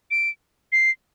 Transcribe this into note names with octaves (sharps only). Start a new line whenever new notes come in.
D7
C7